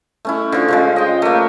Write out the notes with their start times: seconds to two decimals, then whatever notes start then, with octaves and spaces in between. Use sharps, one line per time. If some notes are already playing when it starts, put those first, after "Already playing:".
0.25 A3 C#4 E4
0.52 D3 F3
0.68 C#3 F3 G#3
0.96 D#5 G5
1.22 A3 A#3